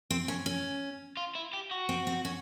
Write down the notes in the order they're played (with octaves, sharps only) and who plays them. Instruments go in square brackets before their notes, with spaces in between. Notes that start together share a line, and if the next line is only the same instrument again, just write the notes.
[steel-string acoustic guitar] C4
C#4
C#4
[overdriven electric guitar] F4
E4
G4
F#4
[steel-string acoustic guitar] C4
C4
C#4